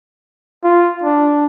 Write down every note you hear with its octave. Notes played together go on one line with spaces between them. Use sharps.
F4
D4